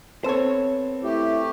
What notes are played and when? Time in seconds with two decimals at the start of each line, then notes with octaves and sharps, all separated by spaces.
0.24 B3 C4 A4 C5 C#5
1.03 A3 E4 G4